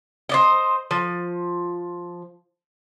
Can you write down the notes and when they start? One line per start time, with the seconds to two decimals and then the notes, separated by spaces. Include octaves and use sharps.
0.29 C5 D5 D#5
0.91 F3